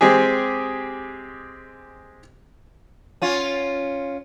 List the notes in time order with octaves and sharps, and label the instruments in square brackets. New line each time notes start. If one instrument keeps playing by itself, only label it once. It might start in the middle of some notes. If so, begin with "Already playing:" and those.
[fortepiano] G#3 C4 G4 G#4
[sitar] C#4 F4